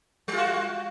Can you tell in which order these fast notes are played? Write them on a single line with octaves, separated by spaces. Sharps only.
G3 F4 F#4